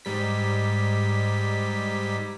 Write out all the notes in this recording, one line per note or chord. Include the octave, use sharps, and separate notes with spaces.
G#2 G3 B6